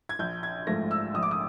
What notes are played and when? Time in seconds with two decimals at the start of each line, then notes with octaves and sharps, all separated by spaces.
0.09 G#6
0.19 A#1 G6
0.43 G#6
0.67 G#2 F3 A3 A#6
0.91 E6
1.14 A#1 D#6
1.23 D6
1.31 D#6